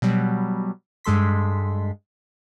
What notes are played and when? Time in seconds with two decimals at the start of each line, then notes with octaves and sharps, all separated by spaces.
0.02 B2 F#3 G3
1.04 G2 G#3 A4 C6 B6